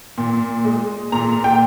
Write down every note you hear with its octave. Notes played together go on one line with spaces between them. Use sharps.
A#2
G#3
A#2 A#5
G5